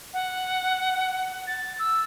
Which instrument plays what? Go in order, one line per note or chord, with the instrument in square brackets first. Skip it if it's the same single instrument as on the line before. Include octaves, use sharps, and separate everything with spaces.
[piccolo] F#5
A6
E6